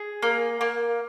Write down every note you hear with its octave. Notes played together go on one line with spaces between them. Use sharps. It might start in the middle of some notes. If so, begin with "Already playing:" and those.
Already playing: G#4
A#3
A#3